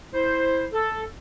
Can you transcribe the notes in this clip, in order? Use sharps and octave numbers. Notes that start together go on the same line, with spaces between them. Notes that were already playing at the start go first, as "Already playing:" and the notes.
E4 C5
A4